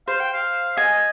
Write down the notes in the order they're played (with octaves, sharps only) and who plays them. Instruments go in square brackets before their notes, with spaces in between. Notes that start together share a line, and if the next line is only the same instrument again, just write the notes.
[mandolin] C5 [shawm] F5
[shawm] G5
F5
[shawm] D#5 [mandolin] G#5